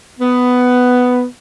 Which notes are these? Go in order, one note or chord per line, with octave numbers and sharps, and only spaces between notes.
B3